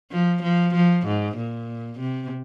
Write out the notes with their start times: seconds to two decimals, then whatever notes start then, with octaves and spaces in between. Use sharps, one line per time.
0.11 F3
0.43 F3
0.75 F3
1.07 G#2
1.38 A#2
2.00 C3